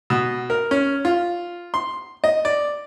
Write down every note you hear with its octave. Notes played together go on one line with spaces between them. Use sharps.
B2
A#4
C#4
F4
C6
D#5
D5